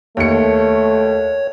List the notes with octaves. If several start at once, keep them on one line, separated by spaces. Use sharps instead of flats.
D#2 A3 C#5 C#7